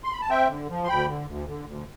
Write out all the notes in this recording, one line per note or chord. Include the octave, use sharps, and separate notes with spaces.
C6
B5
A5
C4 E5 G5
D3
F3
C6
D2 G5 B5
D3
D2
D3
D2